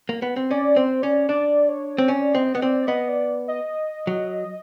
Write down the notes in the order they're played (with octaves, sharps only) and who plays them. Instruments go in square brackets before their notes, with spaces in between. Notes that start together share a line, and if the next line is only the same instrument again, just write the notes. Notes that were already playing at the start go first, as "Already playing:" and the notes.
[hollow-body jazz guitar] A#3
B3
C4
[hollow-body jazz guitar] C#4 [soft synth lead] D5
[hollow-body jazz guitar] C4 [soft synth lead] C5
[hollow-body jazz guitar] C#4 [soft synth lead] D5
[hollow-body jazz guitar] D4 [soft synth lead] D5
[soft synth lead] C#5
[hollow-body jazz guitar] C4
[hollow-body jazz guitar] C#4 [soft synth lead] D5
[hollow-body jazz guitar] C4 [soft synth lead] D#5
[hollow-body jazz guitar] B3
[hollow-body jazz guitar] C4 [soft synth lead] D5
[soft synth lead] D5
[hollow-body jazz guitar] B3 [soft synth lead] D#5
[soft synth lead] D5
D#5
[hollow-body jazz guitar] F#3